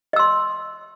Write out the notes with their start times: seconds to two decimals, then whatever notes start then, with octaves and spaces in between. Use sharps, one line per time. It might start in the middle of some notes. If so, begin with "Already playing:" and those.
0.13 D#5
0.16 E6
0.19 C6